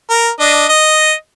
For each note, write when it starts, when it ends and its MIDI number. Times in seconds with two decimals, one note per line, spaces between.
0.10 0.30 70
0.40 0.65 62
0.40 0.65 75
0.69 1.13 75